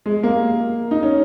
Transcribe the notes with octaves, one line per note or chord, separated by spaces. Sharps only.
G#3
A#3
D#4
C#4